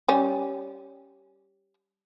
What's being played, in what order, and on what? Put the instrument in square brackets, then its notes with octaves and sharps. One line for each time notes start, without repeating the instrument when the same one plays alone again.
[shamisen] G3 C#4